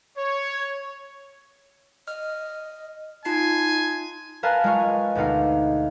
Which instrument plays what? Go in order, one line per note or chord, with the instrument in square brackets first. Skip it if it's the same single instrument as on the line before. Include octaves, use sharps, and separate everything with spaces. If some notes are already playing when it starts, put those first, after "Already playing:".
[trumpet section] C#5
[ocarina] D#5 [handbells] F6
[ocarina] D#4 [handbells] F4 A5 C7 [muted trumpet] G#5
[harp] A#4 B4 F5 G#5 A5 F#6
G#3 F4 F5 C#6
G#5
D2 B2 D4 D#4 F5 C#7